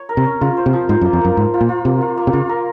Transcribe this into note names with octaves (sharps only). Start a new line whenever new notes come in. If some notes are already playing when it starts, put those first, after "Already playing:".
Already playing: C#5
A#4
C3
C#4
C#3 F4
C5
C3
F3
G#2 C5
F#2
A#3
F2
F#2 A#3
G#2 A#3
F4
A#2
F4
C3 A#3
F4
A#3
C3
C#3 F4
A#4